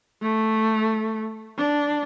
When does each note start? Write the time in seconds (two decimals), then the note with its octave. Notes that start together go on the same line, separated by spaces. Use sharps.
0.23 A3
1.58 D4